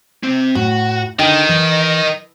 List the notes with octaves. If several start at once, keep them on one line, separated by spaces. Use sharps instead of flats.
C3 C4
A2 F#4
D3 D#3 D#4 D#5 G5
E3